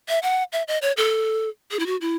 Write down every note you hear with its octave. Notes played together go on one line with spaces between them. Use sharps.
E5
F#5
E5
D#5
C#5
A4
G#4
E4
F#4
E4